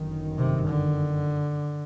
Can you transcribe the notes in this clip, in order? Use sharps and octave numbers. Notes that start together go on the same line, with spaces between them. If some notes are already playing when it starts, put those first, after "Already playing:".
Already playing: G1 F#2 D#3
C3
D3